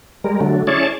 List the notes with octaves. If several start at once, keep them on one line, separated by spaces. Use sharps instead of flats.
G3 G#3 A#4
D3 F#3 A3
C#4 E4 G#4 C#5 D5 A5